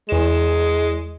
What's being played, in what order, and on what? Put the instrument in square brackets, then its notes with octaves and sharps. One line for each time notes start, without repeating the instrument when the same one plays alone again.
[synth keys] E2 E7 [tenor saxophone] G#3